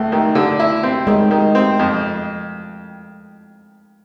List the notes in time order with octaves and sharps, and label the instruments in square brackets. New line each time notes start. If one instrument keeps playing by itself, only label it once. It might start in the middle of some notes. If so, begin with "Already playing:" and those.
Already playing: [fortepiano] C#2 [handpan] A3
[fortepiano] D#3
D3
E4
C4
[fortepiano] D#3 [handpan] G#3
[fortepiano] D#3
C4
F2